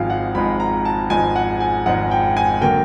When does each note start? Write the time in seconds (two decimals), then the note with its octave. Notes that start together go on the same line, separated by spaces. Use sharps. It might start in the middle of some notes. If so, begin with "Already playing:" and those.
Already playing: G#1 G#2 F3 G#3 F5
0.10 F#5
0.35 G#1 G#2 F3 G#3 B5
0.60 A#5
0.85 A5
1.10 G#1 G#2 F3 G#3 G#5
1.36 F#5
1.60 G#5
1.86 G#1 G#2 F3 G#3 F#5
2.11 G5
2.37 G#5
2.61 D3 F#3 A#3 G5